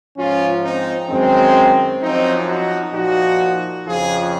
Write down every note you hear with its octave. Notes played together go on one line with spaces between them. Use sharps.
G#2 F3 C#4 F4
C4 D#4
F#2 D#3 G#3 C4
F#2 F3 C4 D#4
D#4 F#4
A#2 F3 D#4 F#4
F2 C#3 F3 F4 G#4